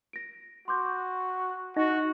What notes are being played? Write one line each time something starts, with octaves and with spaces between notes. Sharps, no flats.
A#6 D7
F#4 C6 D6 G6
D#4 F#4 D#5 A#6